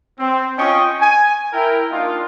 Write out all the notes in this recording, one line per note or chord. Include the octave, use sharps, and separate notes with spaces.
C4
C#4 F4 D#5 G5 C#6 D#6
G#5
E4 A#4 G5
A#3 D4 D#4 F4